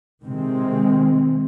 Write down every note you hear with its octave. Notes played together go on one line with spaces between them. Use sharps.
C3 D#3 G#3 C4